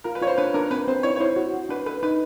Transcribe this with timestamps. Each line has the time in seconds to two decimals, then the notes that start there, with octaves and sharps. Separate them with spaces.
0.04 F4 A#4
0.15 B4
0.21 F4 C#5
0.27 C5
0.38 D4 B4
0.54 D4 A#4
0.71 C4 B4
0.88 C4 C5
1.03 E4 C#5
1.16 C#5
1.20 E4 C5
1.36 F#4
1.54 F#4
1.69 D4 B4
1.86 A4 B4
2.03 D#4 B4